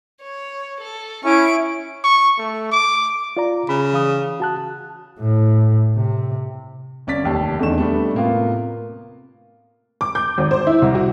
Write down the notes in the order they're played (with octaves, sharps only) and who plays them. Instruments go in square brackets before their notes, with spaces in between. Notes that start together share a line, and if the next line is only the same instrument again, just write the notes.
[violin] C#5
A4
[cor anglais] C#4 [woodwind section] E4 [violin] C#6 D7
[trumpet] C#6
A3
D6
[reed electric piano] F4 D5 A#5
[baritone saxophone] C#3 [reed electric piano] B5
[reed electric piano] E3 F5 D#6
F#4 A5 F#6
[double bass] A2
C3
[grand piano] G1 C#4 D5 A6 B6
F1 D#2 A5
E2 D3 A3 D#4 C#6 E7
G3 A3 B3 C4 D4
A2 C3 A#3 B3 F4
[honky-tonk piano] D6
G6
G#1
C5
E4
C2
F#4